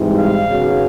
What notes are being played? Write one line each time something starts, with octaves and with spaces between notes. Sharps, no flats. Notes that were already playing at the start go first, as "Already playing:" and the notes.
Already playing: G#2 E3 G3 C4 D#4
F5
F#2 C#3 F#3 B3